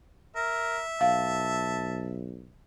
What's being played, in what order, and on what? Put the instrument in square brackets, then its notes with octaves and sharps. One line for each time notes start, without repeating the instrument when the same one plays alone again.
[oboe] A#4 [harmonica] E5
[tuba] B1 [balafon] F5 [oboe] A5